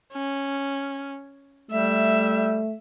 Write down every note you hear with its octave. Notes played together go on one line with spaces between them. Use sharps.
C#4
G3 A3 E5